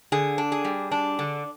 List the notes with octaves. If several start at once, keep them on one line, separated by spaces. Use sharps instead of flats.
D3 G#4
D4
G#4
G3
D4
D3